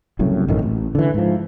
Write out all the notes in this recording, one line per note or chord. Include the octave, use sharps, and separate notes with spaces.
F#1 C2 F#2 A2
A1 F#2 A2 D#3
A1
D3 E3
G#2 F3